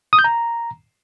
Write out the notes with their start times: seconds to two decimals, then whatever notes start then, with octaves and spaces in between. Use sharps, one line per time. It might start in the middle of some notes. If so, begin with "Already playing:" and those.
0.13 D#6
0.19 G6
0.24 A#5